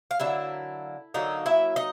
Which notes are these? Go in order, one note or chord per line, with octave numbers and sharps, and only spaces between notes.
F5
D3 F#3 A#3 E4 E5
D3 F#3 A#3 D#4 D#5
E4 E5
D#4 D#5